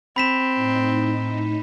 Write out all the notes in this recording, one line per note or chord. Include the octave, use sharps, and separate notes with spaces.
C4 B5 B6 E7
A2 D#4